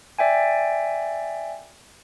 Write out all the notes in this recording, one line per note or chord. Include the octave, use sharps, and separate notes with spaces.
D5 E5 G5 G#5